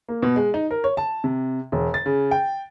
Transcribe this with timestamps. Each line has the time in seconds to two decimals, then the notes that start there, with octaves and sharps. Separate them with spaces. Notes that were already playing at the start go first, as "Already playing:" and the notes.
0.09 A#3
0.22 B2
0.36 G#3
0.54 D#4
0.71 A#4
0.84 C#5
0.97 A5
1.24 C3
1.72 E1
1.94 A6
2.06 C#3
2.31 G5